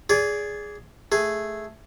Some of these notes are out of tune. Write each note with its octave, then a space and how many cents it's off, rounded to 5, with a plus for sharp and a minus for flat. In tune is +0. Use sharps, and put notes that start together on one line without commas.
G#4 +0 D5 -30
A3 -5 G#4 +0